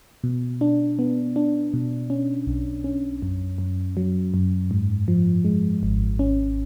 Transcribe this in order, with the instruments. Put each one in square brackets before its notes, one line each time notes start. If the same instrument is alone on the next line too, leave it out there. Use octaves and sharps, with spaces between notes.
[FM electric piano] B2
D4
B3
D4
B2
C#4
B1
C#4
F#2
F#2
F#3
F#2
G#2
F3
G#3
G#1
C#4